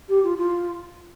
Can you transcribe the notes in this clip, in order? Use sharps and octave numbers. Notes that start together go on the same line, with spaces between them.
G4
F4
F4